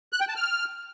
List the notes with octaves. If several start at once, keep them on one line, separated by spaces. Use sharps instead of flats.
F#6
G5
A5
F6